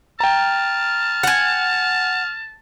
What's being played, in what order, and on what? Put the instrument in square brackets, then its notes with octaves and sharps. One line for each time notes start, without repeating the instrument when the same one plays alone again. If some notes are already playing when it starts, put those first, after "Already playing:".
[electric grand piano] G5 A#5 [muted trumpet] A5 [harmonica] F6
[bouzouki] F#5 G#5